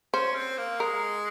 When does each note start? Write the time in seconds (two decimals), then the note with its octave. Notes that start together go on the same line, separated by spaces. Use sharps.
0.14 C#4 C5
0.35 C4
0.58 A#3
0.80 G#3 A#4